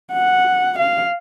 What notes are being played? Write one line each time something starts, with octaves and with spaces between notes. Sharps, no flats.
F#5
F5